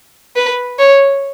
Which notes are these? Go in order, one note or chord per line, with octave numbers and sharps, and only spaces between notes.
B4
C#5